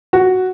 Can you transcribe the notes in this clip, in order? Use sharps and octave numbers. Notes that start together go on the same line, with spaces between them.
F#4